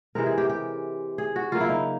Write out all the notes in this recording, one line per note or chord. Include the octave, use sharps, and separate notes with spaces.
C3 E3 G#3 C4 A#4
G#4
G4
G4
G#4
F#4
C#3 F#3 A#3 F4
E4
D#4